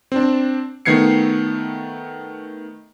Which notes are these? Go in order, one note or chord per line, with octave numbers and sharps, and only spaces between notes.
C4 D4
D#3 A3 B3 G#6 C7 C#7